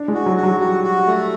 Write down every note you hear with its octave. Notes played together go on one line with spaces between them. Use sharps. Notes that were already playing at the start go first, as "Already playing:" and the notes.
Already playing: D4
G#3
F#4
F#3
F#4
F#3
G3 F#4
F#4
A3